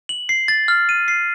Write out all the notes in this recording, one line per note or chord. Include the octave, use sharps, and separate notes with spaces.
F#7
C7
A6
F6
D#7
C7